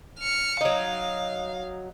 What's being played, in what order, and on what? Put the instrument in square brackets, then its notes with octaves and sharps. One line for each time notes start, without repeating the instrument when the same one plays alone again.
[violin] F6 C#7
[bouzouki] F#3 D#4 [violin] F5